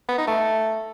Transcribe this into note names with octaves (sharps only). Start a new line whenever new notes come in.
B3
D#4
A3